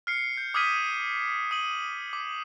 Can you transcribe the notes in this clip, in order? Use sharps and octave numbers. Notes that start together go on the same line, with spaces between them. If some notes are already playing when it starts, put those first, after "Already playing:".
F6 C7 C#7
G6
D6 D#6 F6 G#6 B6 D#7
D#6 D#7 F#7
D6